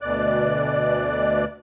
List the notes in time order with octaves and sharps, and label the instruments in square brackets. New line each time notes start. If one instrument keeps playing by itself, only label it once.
[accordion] D2 B2 D5 F#6